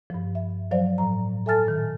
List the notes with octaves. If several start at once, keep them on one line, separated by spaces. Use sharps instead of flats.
G2 F3
E5
F3 F#3 C5 D5 F5
A2 A#5
A4 E5 G#5 A5 F6 A6
A#2 D#3